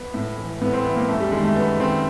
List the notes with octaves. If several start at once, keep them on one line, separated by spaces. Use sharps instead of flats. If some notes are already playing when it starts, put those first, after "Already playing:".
Already playing: B3
A2
E3
A2 B3
C4
E3 B3
A#3
F#2 A3
G3
D#3 G#3
A3
F#2 B3
D#3 C4